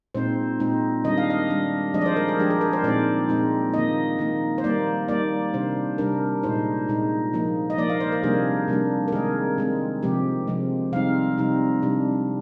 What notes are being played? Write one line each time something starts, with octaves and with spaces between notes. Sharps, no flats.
A#2 G#3 C4 D#4 C5
A#2 G#3 C4 D#4
D#3 G3 D4 D#5
F5
D#5
D#3 G3 D4
F3 G#3 D4 D#5
D5
C5
A#4
G#4
F3 G#3 D4 G4
G#4
A#4
C5
A#2 G#3 C4 D#4 D5
A#2 G#3 C4 D#4
D#3 A#3 D#4 D#5
D#3 A#3 D#4
C5
D#3 G3 A#3 D#4 D5
D#3 G3 A#3 D#4 D5
C3 G3 D4 C5
C3 G3 D4 A#4
A#2 G#3 D#4 C5
A#2 G#3 D#4
F3 A#3 D#4
D#5
F3 A#3 D#4 D5
F5
C5
A#4
C3 G3 A#3 D4 G#4
C3 G3 A#3 D4
A#4
D#3 G#3 C4 G#4
D#3 G#3 C4
C3 F3 G#3 G4
C3 F3 G#3
C3 G3 C4 D#4 F5
C3 G3 C4 D#4
C3 G3 D4